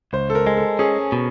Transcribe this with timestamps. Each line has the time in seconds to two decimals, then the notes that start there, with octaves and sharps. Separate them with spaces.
0.13 C#2 C5
0.30 A4
0.35 A#4
0.47 G#3
0.57 A4
0.79 C#4 G#4
1.12 B2